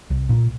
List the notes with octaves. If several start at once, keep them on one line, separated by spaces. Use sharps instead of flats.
C2
A#2